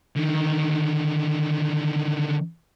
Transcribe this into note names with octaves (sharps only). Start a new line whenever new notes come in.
D3 D#3